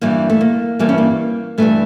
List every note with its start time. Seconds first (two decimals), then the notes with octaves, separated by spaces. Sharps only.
0.01 G2 E3 G3 A#3
0.30 A3
0.41 A#3
0.79 G2 E3 G3 A#3
0.89 C#4
0.98 A#3
1.58 G2 E3 G3 A3